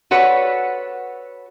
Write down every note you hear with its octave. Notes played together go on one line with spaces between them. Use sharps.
F#4 A4 B4 C#5 D5 F#5